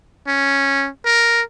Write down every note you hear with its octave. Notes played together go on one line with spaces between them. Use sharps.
C#4
A#4